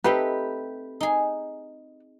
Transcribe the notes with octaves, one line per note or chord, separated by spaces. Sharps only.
A3 C4 D#4 G4 B4
D#4 G#4